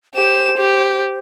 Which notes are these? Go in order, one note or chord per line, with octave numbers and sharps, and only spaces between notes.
G4 C5 E7
G4